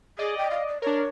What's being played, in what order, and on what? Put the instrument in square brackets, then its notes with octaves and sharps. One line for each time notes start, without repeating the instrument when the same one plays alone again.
[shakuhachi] G#4 [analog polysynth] D5 D#5
[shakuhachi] G5
F5
D5
[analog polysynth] D4 A#4 [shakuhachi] C#5